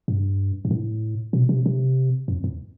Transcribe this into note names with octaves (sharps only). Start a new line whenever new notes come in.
G2
G2
A2
B2
C3
C3
F2
E2